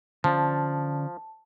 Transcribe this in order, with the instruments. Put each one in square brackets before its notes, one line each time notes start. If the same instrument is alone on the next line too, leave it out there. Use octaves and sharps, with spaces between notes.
[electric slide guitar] D3 C#4 D5 [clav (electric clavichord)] F3 [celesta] A5